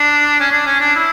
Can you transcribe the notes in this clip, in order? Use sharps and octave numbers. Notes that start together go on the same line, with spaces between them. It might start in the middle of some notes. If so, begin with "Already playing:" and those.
Already playing: D4
C#4
D4
C#4
D4
E4